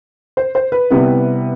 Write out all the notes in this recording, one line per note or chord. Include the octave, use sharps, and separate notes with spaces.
C5
C5
B4
C3 G3 B3 E4